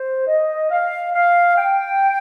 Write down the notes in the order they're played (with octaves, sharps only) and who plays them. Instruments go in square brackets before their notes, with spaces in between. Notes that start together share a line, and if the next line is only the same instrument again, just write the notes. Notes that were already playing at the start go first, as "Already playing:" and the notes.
Already playing: [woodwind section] C5
D#5
F5
F5
G5